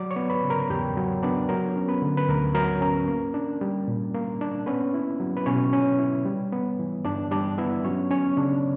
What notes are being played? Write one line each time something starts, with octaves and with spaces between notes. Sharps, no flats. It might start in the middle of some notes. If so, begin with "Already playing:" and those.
Already playing: F#3 D5 D6
C#5 C#6
B3
B4 B5
C#3
A#4 A#5
E2 G4 G5
F#3
B3 D4 D5
F#3 A#4
C#4
B3 B4
D3
B4
D2 A#4
F#3 A#4
C#4 A#4
A#3
D4
G3
A#2
A#3
D4
B3 C#4 B4
E4
F#3
B4
B2 C#4 C#5
C#4
E4
G3
B3
E3
G2 D4 D5
G3 D4 D5
B3 E4 E5
F#3 C#4 C#5
C#4 C#5
C#3 D4 D5